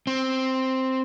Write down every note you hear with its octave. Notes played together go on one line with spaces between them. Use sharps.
C4